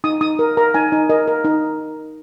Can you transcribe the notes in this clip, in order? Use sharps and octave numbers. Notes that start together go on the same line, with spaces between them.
D#4 D#6
D#4 D#6
A#4
A#4 A#5
D#4 G#5
D#4
A#4 D#5
A#4
D#4